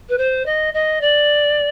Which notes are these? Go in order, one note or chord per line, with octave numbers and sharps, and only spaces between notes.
B4
C5
D#5
D#5
D5